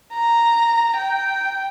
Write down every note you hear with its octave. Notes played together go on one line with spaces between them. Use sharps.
A#5
G5